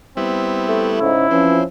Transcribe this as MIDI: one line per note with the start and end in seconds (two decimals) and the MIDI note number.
0.17 1.00 55
0.17 1.00 59
0.17 0.91 60
0.17 1.00 64
0.68 1.09 57
1.00 1.25 44
1.00 1.25 49
1.00 1.64 64
1.31 1.56 52
1.31 1.63 53
1.31 1.64 60
1.31 1.63 61